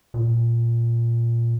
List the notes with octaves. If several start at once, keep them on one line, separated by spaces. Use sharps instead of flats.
A#2